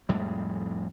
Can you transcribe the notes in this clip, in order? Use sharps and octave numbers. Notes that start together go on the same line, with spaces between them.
F2 A2 G3 G#3